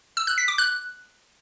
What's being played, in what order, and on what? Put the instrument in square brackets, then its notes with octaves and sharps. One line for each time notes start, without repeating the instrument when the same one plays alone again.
[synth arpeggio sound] E6
F#6
B6
D6
F#6